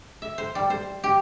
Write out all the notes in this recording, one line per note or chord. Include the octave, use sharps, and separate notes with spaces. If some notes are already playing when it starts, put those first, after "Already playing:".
E5
C5
G3
C5
G4